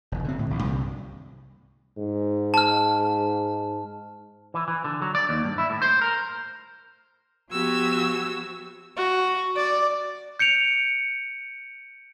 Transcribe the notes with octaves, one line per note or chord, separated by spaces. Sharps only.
F1 D#2
D3 C4
A2
A1 D2
C2 G2 C3 D#3
G#2
A5 F6
E3
E3
D3
F#3
D5
D#2
G2
E4
A2
C5
A#4
F3 B3 F#4 G4 E6 G#6
F#4
D5
G6 C#7 D7 F7